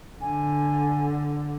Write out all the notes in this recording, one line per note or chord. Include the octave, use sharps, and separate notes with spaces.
D3 G#5